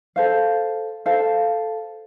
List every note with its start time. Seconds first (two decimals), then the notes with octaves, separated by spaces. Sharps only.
0.16 A4 C5 F5
1.06 A4 C5 F5